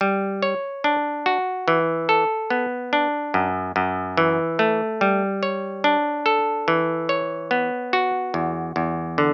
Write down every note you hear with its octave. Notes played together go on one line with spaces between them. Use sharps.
G3
C#5
D4
F#4
E3
A4
B3
D4
F#2
F#2
E3
A3
G3
C#5
D4
A4
E3
C#5
B3
F#4
E2
E2
D3